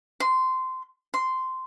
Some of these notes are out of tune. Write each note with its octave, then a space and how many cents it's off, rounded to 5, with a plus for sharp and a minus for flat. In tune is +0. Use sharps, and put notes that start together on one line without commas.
C6 -15
C6 -10